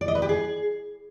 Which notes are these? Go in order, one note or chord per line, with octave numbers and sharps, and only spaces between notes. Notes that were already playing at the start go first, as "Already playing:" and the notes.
D5
D#5
B4
G4
G#4